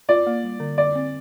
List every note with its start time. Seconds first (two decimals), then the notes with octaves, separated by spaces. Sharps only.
0.09 F4 D5
0.26 A#3
0.43 G3
0.60 D3
0.77 D3 D5
0.95 C4